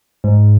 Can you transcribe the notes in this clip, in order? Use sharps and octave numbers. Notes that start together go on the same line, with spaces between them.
G#2